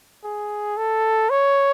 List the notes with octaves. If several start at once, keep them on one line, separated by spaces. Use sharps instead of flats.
G#4
A4
C#5